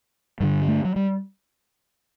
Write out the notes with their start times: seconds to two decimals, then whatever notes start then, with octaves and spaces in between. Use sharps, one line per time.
0.40 G2 D3 G3
0.68 A3
0.85 F#3
0.96 G3